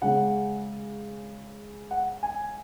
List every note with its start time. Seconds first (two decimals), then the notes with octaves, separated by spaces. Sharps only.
0.02 C#3 G#3 C#4 F#5
1.91 F#5
2.23 G#5